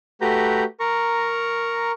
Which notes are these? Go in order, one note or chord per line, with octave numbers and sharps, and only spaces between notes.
A3 F#4 G4 B4 A#5 G6
A#4 A#5 C#6